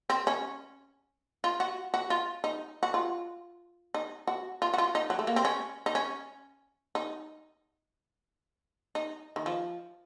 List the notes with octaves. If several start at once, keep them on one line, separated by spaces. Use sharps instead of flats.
C4
C#4
F4
F#4
F#4
F4
D#4
F#4
F4
D#4
F#4
F4
F#4
F4
D#4
F#3
A3
A#3
C4
C#4
D#4
C#4
D#4
D#4
D#3
F3